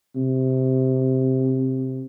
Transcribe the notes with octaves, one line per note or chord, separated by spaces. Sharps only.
C3